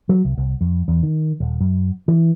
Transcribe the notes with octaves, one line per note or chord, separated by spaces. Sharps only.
F#3
C2
C2
F2
E2
D#3
D#1
F#2
E3